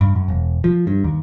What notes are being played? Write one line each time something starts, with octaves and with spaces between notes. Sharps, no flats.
G2
F#2
E1
F3
G2
D#2